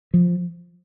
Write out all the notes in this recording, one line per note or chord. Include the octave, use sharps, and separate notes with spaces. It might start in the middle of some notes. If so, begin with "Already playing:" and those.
F3